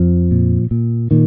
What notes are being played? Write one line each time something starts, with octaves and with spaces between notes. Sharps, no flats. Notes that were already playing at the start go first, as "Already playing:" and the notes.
Already playing: F2 F3
A#2
A#2
A#2 D#3